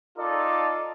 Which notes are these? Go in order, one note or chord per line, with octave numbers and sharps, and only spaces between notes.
D#4 F4 A4 D5